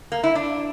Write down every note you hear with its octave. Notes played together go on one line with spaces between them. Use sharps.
A#3
E4
D4